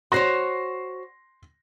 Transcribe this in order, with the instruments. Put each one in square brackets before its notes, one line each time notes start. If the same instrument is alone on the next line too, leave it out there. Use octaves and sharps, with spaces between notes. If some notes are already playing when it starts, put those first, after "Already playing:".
[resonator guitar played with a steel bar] F#4 C5 C#5 [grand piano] C6 A#6